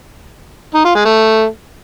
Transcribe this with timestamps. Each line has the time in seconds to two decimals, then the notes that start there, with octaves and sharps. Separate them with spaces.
0.75 D#4
0.85 F4
0.95 G#3
1.05 A3